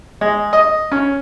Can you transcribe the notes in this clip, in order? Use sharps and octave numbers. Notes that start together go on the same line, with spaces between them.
G#3
D#5
C#4